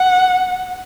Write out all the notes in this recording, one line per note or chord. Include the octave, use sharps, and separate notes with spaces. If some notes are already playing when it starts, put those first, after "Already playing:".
Already playing: F#5